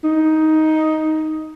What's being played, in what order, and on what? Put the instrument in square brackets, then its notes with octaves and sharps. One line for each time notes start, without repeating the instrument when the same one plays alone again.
[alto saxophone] D#4